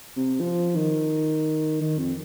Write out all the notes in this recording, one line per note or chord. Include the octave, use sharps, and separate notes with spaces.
C3
F3
D#3
D#3
F2